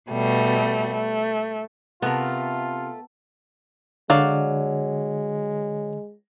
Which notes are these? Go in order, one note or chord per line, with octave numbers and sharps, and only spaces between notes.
B2 G3 A3
A3
C3 A3 B3 F4 A#4
D3 F#3 G#3 D5 F5